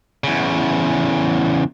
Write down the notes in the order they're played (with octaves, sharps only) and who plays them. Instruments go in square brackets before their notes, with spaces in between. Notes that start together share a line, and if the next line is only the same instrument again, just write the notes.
[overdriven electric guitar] E2 C#3